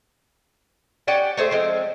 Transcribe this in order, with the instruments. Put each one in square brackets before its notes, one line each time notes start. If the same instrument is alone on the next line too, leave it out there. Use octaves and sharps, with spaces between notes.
[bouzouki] C#4 G4 D5 F#5
A3 G#4 C5 E5
F3 G#3 C4